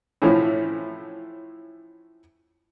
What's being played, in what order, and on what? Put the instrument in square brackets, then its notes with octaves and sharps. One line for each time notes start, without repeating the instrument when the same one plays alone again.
[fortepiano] A2 E3 F3 C#4 E4